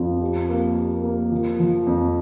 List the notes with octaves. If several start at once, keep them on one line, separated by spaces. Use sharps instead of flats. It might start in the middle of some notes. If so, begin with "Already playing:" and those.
Already playing: F2 F3
G4
A#3
G4
A#3
F3
F3
F2